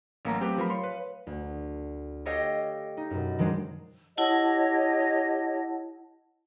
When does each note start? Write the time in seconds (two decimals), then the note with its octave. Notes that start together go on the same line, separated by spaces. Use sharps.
0.25 A1 F#3 A3 A#3 F5 A#5
0.40 C4 G4 B4
0.58 F3 A#4 B5
0.70 C#5 F5 C6
0.84 B4
1.27 D2
2.25 G4 A4 C#5 D#5 F5 G5
2.97 D#4
3.10 F#2 B2
3.38 D#3 F3 F#3 G#3 D4
4.18 E4 G4 C#5 D#5 F#5 A5